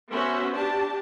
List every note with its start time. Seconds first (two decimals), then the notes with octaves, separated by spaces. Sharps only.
0.11 B3 C#4 F#4 C5 E5
0.54 D4 G4 A5